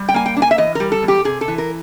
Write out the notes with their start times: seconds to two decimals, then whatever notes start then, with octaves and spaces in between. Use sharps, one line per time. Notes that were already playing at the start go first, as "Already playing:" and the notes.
Already playing: G3
0.09 G5
0.14 A#3 G#5
0.26 G5
0.37 D4
0.42 G#5
0.51 E5
0.58 E3 D#5
0.75 G3 A#4
0.92 A4
1.03 E2
1.08 G4
1.24 C3 G#4
1.41 A4
1.48 E3
1.58 A#4